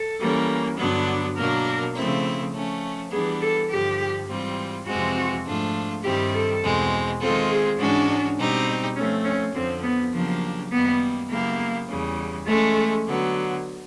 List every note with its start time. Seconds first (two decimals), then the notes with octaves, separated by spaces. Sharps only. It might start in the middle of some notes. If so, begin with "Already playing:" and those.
Already playing: A4
0.19 E3 G3 A#3 C#4
0.77 G2 D3 F#3 B3 D4
1.36 B2 F#3 A#3 D4 A#4
1.94 C#3 F3 A3 C4 E4
2.53 F3 A3 C#4
3.11 E3 G3 B3 D4 G#4
3.41 A4
3.69 G2 D3 F3 G4
4.28 G#2 E3 G3 C4 F4
4.86 F2 C3 E3 G#3 C4 F#4
5.46 G#2 F3 A3 D4 F4
6.03 G2 D#3 G3 C4 E4 G4
6.33 A4
6.62 E2 B2 G#3 C4
7.21 D#3 G#3 C4 F4 A4
7.50 G#4
7.78 G#2 E3 G#3 C#4 D4 F#4
8.37 B2 G3 C4 D#4 G4
8.95 F3 A3 C4 C#4
9.24 C#4
9.54 F2 D3 F3 C4
9.83 B3
10.12 C#3 F3 F#3 A#3 D4 G4
10.71 F#2 D#3 G3 A#3 B3
11.29 C#3 F#3 A#3 B3 E4 G4
11.88 E2 C#3 E3 G3
12.46 E3 G#3 A3 C#4
13.05 D3 F#3 B3